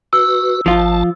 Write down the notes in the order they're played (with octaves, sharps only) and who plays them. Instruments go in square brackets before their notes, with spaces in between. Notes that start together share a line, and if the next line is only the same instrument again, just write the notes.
[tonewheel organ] F#4 B4 [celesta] E6
[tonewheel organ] G#1 A5 [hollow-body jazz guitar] F3 F4